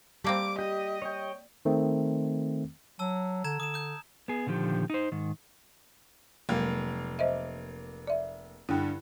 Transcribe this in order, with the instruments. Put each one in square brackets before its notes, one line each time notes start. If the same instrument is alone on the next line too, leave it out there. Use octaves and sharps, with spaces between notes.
[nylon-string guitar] G3 [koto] A3 A#3 C4 [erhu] D6
[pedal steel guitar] G4 [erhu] D#5
[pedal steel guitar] C#5 G5
[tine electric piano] D#3 A3 C4
[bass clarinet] F#3 [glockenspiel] A5 E6
[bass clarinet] D3 [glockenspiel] A#5 G#6 E7
[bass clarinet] D3 [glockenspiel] D#6 E7
[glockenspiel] D#6 G6
[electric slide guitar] B3 G#4
A#2 D3 D#3 F3 G4
D#4 C5
G#2 D#3
[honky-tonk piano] F1 A#3 [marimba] F#3 G#3
[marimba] C5 D#5 E5
D5 E5
[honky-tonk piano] G2 D3 [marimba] E4 G5